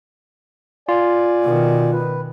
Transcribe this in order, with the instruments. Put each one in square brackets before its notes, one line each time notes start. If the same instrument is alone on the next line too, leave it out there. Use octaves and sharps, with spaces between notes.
[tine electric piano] F4 [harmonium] D5 G#5
[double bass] B2 D#3
[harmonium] B4